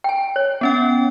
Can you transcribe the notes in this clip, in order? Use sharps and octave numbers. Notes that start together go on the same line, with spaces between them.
G5 G#5
C#5
B3 C#4 G5